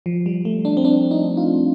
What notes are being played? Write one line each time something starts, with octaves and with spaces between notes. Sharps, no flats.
F3
G3
A3
D4
C4
D4
D#4
F4